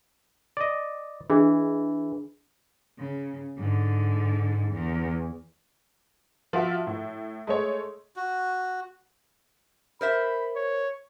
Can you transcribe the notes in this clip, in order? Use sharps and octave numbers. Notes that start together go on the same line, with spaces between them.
D5 D#5
E3 D4 G#4 D#5
C#3
G#2 D3
E2
F3 F4 F#4 E5 F5
A2
G#3 A3 C#5
F#4
A#4 C5 E5 B5
C#5